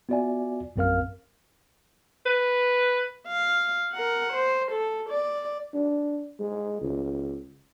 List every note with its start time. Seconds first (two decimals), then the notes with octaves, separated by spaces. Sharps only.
0.09 B3 F4 F#4 D5 E5 G#5
0.76 A#1 F#2 C4 A#4 F5 F6
2.26 B4
3.28 F5
3.92 A#4 F#5
4.33 C5
4.72 A4
5.09 D5
5.74 D4
6.40 G#3
6.81 C#2